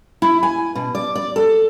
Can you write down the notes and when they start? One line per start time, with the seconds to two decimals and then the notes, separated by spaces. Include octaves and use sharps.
0.22 E4
0.43 G#5
0.75 B2
0.95 D5
1.15 D5
1.36 A4